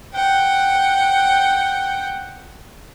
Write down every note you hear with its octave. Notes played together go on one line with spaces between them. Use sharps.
F#5 G5